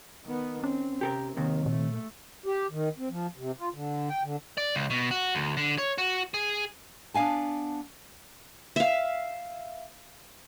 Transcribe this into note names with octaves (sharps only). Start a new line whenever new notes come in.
D#3 B3
C4 C#4
C3 G4 A4 A#4
D#2 C3 D#3
A#2 A3
G4
D#3
C4
F3
C3
F4
D3
G5
D3
D5
C#2
B2
F#4
D2
D3
C#5
F#4
G#4
B3 D4 F5 G#5 A5
E5 F5